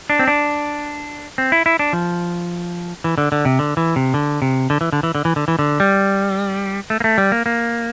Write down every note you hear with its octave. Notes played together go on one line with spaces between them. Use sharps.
D4
C4
D4
C4
E4
E4
D4
F3
E3
D3
D3
C3
D3
E3
C3
D3
C3
D3
E3
D3
E3
D3
E3
D3
E3
D3
G3
A3
A#3
A3
G3
A#3
A#3